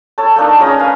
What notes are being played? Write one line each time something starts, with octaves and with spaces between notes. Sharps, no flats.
A4 C#5 A5
A3 A#3 D4 D#4
G#3 C#4 A#5 D#6
B4 F5 G#5